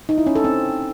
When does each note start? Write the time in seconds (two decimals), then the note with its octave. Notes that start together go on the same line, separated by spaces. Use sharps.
0.09 D#4
0.18 E4
0.27 C#4
0.35 A4
0.44 C4